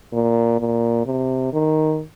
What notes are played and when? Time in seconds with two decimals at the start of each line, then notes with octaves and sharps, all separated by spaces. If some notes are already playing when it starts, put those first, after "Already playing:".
0.13 A#2
0.60 A#2
1.06 C3
1.53 D#3